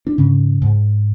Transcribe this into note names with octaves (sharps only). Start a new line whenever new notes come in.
D4
G#2 C#3 C#4
G#2